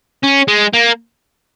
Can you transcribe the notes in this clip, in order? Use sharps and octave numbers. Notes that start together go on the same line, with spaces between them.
C#4
G#3
A#3